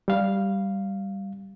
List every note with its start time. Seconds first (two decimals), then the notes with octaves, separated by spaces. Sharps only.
0.08 G3 F5